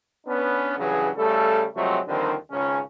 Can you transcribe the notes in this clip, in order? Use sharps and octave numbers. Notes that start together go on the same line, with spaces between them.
B3 C#4 D4
G2 C#3 E3 F#3 G#4
C#3 G3 A3 A4
C3 F3 F#3 G#3 A3 C4
D#2 D3 D#3 F3 G3 C4
G#1 C#2 C#3 C#4